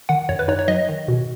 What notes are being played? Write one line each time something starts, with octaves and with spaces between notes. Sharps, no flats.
D#3 F#5
F#2 C#5
B4
D#4 C#5
C#5
F#3 D#5
D#3
B2